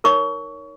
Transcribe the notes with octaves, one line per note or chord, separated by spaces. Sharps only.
D#4 A#4 C#5 C#6